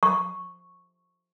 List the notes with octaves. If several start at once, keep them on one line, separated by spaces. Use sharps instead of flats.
C#6